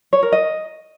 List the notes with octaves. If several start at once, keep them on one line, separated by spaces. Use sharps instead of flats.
C#5
A#4
D#5